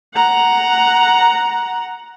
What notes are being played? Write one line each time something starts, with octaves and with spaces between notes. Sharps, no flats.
F#5 A#5